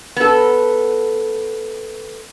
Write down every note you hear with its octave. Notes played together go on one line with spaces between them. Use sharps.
B3 A4